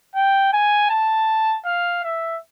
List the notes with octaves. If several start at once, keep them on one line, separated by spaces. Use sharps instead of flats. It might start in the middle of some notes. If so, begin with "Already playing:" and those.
G5
G#5
A5
F5
E5